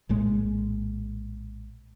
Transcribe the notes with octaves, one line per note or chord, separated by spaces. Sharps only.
A#1 A2 G#3